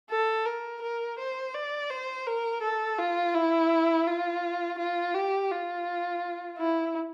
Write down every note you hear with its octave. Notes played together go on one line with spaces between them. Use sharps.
A4
A#4
A#4
C5
D5
C5
A#4
A4
F4
E4
F4
F4
G4
F4
E4